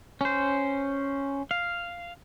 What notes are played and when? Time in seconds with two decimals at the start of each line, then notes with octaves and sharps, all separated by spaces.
0.21 C#4 C5
1.51 F5